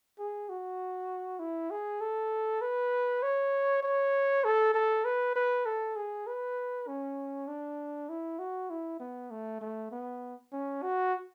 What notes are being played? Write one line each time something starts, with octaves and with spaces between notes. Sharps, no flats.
G#4
F#4
E4
G#4
A4
B4
C#5
C#5
A4
A4
B4
B4
A4
G#4
B4
C#4
D4
E4
F#4
E4
B3
A3
A3
B3
C#4
F#4